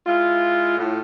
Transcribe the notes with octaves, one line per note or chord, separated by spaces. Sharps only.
G#3 E4 F4
A2 F4